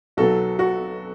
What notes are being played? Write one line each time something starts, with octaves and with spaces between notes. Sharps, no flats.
B1 B2 F#3 F#4 A4
F#4